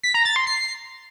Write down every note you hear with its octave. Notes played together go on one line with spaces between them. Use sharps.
B6
A#5
A6
C6
C7